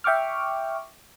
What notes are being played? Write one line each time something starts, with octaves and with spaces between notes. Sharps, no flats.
E5 G5 C#6 D6 F6